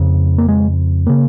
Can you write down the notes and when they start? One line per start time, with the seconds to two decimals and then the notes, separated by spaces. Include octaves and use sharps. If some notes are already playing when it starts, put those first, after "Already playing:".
Already playing: F2 C#3
0.38 A#3
0.48 G#3
1.07 C#3 A#3